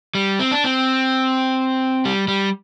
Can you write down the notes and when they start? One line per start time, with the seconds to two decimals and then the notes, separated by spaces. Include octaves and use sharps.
0.15 G3
0.39 C4
0.51 D4
0.64 C4
2.05 G3
2.28 G3